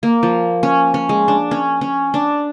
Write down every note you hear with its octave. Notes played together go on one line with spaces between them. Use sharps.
A#3
F3
C#4
C#4
G#3
D4
C#4
C#4
D4